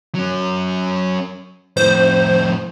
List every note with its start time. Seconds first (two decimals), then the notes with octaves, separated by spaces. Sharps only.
0.15 F#3 C#4
1.77 F2 A2 C5